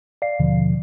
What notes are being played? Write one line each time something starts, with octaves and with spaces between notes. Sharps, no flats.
D5 F5 C7
D#2 B2 D3 F3